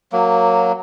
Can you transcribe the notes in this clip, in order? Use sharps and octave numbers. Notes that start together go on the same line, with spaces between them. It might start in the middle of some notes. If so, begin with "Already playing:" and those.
F#3 A#3